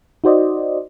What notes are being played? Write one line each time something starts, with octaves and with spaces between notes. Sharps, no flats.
D#4 F#4 C5 D5 D#5